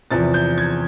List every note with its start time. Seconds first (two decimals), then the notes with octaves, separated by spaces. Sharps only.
0.11 E2 C3 F3 A6
0.34 G6
0.58 G#6